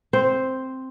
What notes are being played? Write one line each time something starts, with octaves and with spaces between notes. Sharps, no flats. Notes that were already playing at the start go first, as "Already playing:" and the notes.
C4 C5